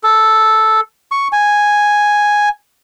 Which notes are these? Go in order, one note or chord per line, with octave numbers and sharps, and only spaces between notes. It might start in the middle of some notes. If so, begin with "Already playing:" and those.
A4
C#6
G#5